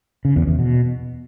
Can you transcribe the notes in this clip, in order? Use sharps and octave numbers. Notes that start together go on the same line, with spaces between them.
C#3
E2
E2
B2